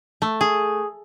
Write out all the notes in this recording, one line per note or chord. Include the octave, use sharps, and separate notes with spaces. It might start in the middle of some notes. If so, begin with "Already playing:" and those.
A3
G#4